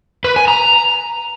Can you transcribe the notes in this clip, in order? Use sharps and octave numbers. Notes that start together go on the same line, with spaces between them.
B4
G#5
A#5